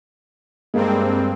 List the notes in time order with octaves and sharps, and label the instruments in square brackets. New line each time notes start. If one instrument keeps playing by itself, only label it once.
[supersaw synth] G2 C4 [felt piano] G#3 A#3